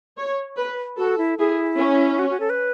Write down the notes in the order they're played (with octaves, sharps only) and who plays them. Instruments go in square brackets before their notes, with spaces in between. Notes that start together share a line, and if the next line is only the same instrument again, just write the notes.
[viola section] C#5
B4
[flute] F#4 [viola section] A4
[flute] E4
[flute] E4 [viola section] G#4
[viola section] C#4
[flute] F#4
F#4
A4
B4